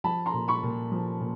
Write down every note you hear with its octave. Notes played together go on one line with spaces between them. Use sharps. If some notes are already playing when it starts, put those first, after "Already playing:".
F3 A5 B5
A#5 C6
A#2
B5 C#6
A#2
F3
A#2